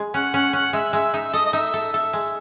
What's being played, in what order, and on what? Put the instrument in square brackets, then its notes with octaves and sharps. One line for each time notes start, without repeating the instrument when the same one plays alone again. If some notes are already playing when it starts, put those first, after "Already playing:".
Already playing: [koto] G#3
[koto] C#4 [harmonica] F#5
[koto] C#4 [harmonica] F#5
[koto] C#4 [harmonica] F#5
[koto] G#3 [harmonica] E5
[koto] G#3 [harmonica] E5
[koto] D#4 [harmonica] E5
[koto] A4 [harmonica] D#5
[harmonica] D#5
[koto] D#4 [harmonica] E5
[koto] A4
[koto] A4 [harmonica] E5
[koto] G#3